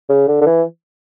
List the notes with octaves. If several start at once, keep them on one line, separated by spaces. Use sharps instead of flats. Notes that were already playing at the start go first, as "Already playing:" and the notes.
C#3
D3
D3
E3